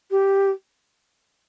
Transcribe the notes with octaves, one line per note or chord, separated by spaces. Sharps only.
G4